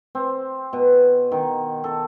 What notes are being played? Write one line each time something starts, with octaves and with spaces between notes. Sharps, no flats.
C4
B2
D#3
A4